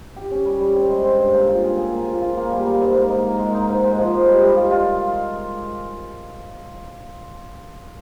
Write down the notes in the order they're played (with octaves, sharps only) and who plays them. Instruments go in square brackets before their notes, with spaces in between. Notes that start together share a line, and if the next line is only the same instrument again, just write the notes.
[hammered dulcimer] G4
C#4
G3
G3
C4
G#3
C4
G2
A#3
F4
G#4
G#4
A#3
F4
F4
A#3
G3
A#3
G#2
A#3
D#4
A#4
G#3
D#4
G#2
G#3
F3
G#3
G3
G3
F4
F4